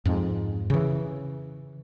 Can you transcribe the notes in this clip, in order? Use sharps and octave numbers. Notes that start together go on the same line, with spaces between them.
F2 G#2
C#3 E3